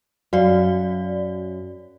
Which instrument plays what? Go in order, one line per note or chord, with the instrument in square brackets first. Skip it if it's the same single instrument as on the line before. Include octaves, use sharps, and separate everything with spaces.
[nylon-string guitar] F#2 F5 [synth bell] F#4 D5